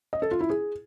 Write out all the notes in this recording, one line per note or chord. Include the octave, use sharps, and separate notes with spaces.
D#5
A4
F4
E4
G#4